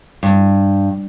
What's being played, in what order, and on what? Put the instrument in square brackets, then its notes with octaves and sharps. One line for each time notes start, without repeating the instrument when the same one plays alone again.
[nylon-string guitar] G2